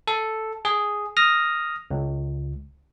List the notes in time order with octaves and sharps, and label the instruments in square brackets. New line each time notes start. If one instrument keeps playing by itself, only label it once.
[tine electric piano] A4
G#4
D#6 F6 A#6
C#2